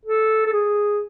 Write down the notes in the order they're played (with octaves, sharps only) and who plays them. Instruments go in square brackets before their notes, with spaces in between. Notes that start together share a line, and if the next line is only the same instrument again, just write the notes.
[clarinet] A4
A4
G#4